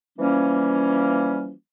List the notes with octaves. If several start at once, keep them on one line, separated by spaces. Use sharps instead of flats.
E3 F3 G3 A#3 C#4